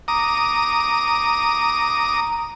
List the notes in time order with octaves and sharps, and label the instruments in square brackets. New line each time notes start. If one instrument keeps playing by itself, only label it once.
[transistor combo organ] A#5 D6 D#6